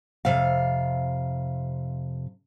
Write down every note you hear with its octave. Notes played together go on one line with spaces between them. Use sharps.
F2 C3 F5